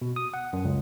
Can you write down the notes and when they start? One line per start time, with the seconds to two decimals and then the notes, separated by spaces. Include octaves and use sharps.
0.01 B2
0.16 D#6
0.34 F#5
0.53 F#2
0.65 C#2